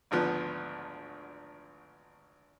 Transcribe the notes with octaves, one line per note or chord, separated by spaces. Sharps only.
G#1 D2 F3 B3